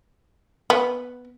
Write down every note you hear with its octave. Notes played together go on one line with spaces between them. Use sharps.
B3